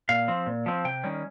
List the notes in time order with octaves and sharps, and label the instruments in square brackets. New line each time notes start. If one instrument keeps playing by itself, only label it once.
[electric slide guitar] A#2 F5
F3 C4
A#2
F3 C4
C3 G5
D#3 G3 C#4